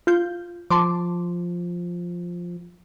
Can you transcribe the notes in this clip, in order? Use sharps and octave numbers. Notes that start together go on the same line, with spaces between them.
F4 G6
F3 A5 C6 D6